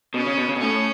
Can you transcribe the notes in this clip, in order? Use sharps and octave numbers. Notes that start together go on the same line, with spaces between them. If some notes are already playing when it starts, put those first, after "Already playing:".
B2 C#4
C#3
B2
C#3
B2
A2 C#4